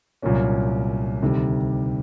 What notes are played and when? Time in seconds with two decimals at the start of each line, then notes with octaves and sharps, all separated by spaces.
0.22 C2 A#2 F#3 A#3 C#4
1.22 D2 C3 D#3 G3